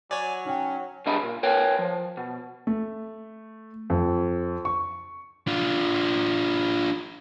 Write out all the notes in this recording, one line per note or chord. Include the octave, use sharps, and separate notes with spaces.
F#3 C#5 D5 G#5
C#4 D#4 G5
C#2 G3 D4 D#5 E5 B5
A#2
A#4 B4 C#5 G5
F3
B2
A3
F2
C#6
D4 F4